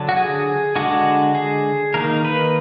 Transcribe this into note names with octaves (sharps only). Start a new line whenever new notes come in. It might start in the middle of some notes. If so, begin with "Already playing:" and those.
Already playing: D3 F#3 D4
F#4
G#4
D3 G#3 D4 F#4
G#4
D#3 A#3 D#4 A#4
B4